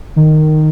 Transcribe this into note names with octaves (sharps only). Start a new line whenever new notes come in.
D#3